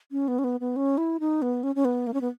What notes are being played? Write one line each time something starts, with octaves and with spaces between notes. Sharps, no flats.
C#4
B3
C#4
B3
B3
C#4
E4
D#4
B3
C#4
C#4
B3
A#3
C#4
B3